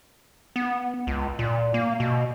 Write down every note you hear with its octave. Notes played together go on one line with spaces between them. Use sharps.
B3
C#2
A#2
A#3
B2